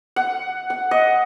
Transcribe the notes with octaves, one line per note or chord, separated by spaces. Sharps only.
F#5
F#5
D#5